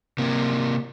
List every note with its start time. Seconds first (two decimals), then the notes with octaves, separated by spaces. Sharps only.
0.18 C3 A#3